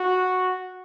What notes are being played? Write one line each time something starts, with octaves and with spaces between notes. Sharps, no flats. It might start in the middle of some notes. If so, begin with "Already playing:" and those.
Already playing: F#4